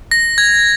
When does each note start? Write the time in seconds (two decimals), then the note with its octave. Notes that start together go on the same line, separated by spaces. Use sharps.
0.11 A#6
0.38 G#6